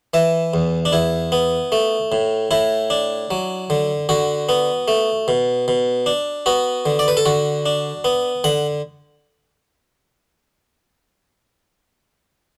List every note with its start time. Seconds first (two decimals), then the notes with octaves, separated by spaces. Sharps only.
0.14 E3 E5
0.54 E2
0.85 D4
0.92 E2 E4
1.32 B3
1.72 A3
2.12 A2
2.51 A2 E4
2.90 D4
3.31 F#3
3.70 D3
4.09 D3 F#4
4.49 B3
4.88 A3
5.28 B2
5.68 B2
6.06 D4
6.46 B3 F#4
6.86 D3
6.99 D5
7.08 B4
7.17 A4
7.26 D3 F#4
7.66 D4
8.04 B3
8.44 D3 F#5